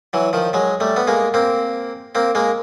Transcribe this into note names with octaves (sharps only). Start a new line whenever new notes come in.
E3 F#3
D#3 F3
F#3 G#3
G3 A3
B3
G#3 A#3
A#3 C4
A#3 C4
G#3 A#3